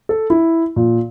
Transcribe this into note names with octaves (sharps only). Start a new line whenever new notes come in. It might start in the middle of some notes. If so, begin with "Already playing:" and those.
A4
E4
A#2